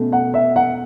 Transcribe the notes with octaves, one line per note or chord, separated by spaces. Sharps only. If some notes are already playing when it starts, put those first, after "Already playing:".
Already playing: B2 A3 C#4
F#5
E5
F#5